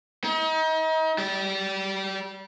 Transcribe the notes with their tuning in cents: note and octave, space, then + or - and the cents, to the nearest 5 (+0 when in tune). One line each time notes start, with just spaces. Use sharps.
D#4 +35
G3 -25